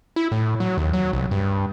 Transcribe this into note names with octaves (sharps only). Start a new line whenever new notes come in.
E4
A2
F#3
D#2
F#3
C2
G2